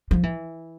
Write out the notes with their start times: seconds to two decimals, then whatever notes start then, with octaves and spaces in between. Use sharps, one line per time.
0.11 F3
0.23 E3